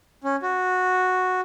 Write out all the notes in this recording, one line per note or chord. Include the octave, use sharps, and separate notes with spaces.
C#4
F#4